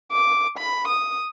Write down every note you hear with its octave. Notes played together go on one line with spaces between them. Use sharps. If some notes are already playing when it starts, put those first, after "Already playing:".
D6
B5
D#6